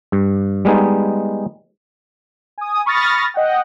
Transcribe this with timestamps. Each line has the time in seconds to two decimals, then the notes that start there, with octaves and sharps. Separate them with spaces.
0.12 G2
0.65 G3 G#3 B3 D#4
2.58 G#5 D#6
2.86 B5 C#6 D#6 F6 A6 A#6
3.34 D#5 F#5 G5